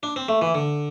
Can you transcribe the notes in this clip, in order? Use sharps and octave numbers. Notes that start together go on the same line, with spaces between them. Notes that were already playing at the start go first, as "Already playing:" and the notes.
D4
C4
A3
E3
D3